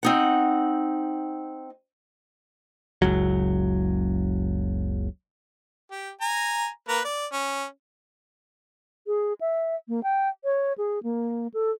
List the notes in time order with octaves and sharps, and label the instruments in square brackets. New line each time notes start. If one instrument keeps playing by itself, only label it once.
[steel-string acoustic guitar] C4 D#4 F#5
[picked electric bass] F#1 C#2 F#3
[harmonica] G4
G#5 A#5
A#3 B4 A#5
D5
C#4
[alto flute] G#4
E5
A#3
G5
C#5
G#4
A#3
A4